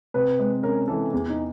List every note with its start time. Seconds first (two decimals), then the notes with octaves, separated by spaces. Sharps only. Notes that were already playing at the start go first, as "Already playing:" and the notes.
0.14 C3 B4
0.39 G#3
0.63 C#4 A#4
0.88 E3 A4
1.13 E2 G#4
1.29 D#4